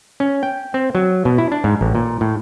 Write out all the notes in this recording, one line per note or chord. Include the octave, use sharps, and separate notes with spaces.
C#4
G5
C4
F#3
B2
E4
D4
G#2
A1
A#2
A2